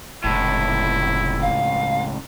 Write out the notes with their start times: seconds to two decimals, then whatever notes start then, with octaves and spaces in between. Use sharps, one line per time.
0.24 F1 C#2 A2 E4
1.42 F5